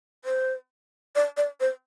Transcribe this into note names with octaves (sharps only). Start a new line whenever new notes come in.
C5
D5
D5
C5